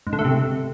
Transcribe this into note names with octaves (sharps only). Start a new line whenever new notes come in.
G#2
D3
A3
C3